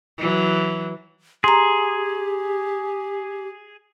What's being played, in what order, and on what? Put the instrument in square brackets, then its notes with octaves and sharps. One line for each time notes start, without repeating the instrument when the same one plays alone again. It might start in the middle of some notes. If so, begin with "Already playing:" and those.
[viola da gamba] E3 F#3
[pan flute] G4 [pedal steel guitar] G#4 [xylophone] A#5 C6